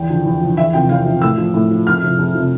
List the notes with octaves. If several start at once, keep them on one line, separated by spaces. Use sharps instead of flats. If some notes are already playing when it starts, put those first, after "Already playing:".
Already playing: E2 G5
D3 F3
E2
D3 F3
E2 E5
C3 F3 G5
E2 F5
C3 F3
A2 E6
F3
A2
F3
F2 F6
C3 F3
F2
C3 F3